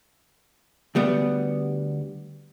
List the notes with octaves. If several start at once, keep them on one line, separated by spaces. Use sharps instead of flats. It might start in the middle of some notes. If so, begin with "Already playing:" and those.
D2 G3 B3